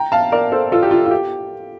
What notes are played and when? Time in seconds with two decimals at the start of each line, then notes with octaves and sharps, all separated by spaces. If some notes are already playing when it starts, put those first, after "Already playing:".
Already playing: G5 A#5
0.12 F5 A5
0.32 A#4 D5
0.52 A4 C5
0.72 F4 A4
0.83 G4
0.91 F4
1.05 F4
1.11 G4